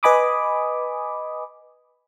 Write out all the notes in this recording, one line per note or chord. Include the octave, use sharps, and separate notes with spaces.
B4 D#5 G#5 B5 D6 D#6